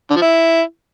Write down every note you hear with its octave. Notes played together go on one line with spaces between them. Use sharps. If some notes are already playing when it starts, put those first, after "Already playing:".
D3
F3
E4